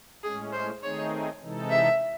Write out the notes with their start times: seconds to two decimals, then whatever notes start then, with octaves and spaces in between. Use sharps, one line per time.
0.23 A2 G#3 C#4 G#4
0.53 C5
0.82 D#3 A3 C4 D#4 G#4 C#5
1.42 C3 E3 G#3 D#4 A4
1.70 E5